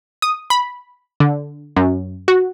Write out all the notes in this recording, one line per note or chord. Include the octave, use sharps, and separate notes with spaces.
D#6
B5
D3
F#2
F#4